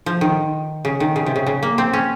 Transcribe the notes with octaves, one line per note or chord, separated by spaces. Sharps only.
F3
D#3
C#3
D#3
C#3
C3
C#3
C#3
A#3
C4
C#4